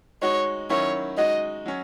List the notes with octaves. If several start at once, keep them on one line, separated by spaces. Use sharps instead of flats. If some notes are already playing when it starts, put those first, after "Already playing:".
G#3 D#4 F#4 C#5
D#3 F#3 C#4 E4 C#5
G#3 D#4 F#4 D#5
F#3 C#4